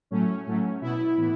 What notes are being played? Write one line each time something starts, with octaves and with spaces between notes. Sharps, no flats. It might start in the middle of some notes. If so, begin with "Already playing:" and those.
A2 F#3 A3 C#4
A2 F#3 A3
B2 B3 E4
A2 E3 B3